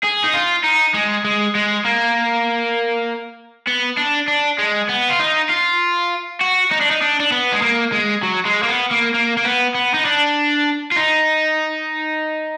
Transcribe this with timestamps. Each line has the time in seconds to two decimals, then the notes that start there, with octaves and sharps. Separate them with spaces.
0.03 G#4
0.24 D#4
0.34 F4
0.64 D#4
0.94 G#3
1.25 G#3
1.55 G#3
1.85 A#3
3.67 B3
3.98 D4
4.28 D4
4.59 G#3
4.89 B3
5.10 F4
5.19 D#4
5.49 F4
6.41 F#4
6.71 D#4
6.80 D4
6.91 D#4
7.01 D4
7.20 D4
7.32 B3
7.52 G#3
7.62 A#3
7.92 G#3
8.23 F#3
8.45 G#3
8.63 A#3
8.69 B3
8.91 A#3
9.14 A#3
9.37 A#3
9.45 B3
9.75 B3
9.94 D#4
10.05 D4
10.92 F4
10.96 D#4